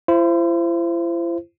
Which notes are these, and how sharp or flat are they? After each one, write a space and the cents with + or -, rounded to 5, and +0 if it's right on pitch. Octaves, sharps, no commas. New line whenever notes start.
E4 +45 C5 +0